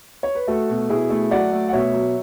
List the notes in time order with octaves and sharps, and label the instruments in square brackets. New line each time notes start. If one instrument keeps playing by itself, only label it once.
[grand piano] C#5
B4
A3 F#4 A4
B2
B2 E4 G#4
A3
F#3 D5 F#5
A3
F#5
B2 C#5 E5
F#3